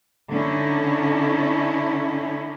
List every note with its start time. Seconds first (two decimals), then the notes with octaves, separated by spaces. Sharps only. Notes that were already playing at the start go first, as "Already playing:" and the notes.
0.30 D3 C#4 D#4 E4